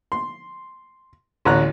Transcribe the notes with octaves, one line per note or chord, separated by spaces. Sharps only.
C6
A1 D2 C#5 A#5 F#6